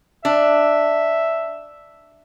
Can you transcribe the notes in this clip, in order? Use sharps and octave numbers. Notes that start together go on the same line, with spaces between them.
D4 E5